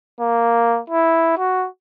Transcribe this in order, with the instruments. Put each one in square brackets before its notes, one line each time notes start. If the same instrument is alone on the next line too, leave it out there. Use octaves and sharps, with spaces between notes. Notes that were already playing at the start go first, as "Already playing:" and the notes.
[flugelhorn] A#3
E4
F#4